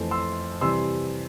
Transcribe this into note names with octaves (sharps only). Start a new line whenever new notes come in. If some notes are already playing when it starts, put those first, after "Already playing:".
Already playing: F2 E3 A3 C4
C6 E6
C3 E3 G3 C6 E6